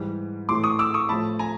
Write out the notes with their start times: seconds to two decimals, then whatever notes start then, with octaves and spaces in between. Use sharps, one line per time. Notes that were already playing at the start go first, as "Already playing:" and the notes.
Already playing: G#2 E3 G3
0.49 A2 E3 A3 C6 D6
0.64 C#6 D#6
0.79 D6 E6
0.94 C#6 D#6
1.09 A2 F3 A3 A5 B5
1.39 G#5 A#5